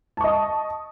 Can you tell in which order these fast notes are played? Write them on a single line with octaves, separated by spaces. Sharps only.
A5 C#6 D#5 D#6